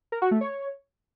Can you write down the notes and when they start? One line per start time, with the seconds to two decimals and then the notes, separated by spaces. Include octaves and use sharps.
0.12 A#4
0.22 F#4
0.31 A3
0.41 C#5